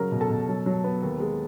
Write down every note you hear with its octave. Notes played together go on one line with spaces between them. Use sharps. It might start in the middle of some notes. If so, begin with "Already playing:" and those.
Already playing: C#3 F#3 A#4 A#5
B2
A4 A5
B2
F#3
F#3
B3
D#2
G#3